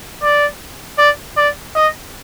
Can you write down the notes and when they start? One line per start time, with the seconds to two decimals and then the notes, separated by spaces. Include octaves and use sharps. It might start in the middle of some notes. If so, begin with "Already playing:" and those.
0.23 D5
0.98 D5
1.37 D5
1.75 D#5